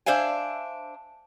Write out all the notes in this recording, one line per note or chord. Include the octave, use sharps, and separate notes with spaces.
D4 C5 E5 F5 G#5